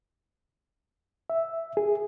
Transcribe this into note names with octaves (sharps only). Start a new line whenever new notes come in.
E5
G#4